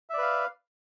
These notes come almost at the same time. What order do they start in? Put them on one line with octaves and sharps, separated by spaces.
E5 D5 B4 F5